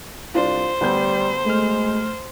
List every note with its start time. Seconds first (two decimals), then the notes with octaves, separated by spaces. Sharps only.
0.35 C2 D4 F4 C5
0.81 D2 G3 B3 G6
1.46 G#3 A3 F6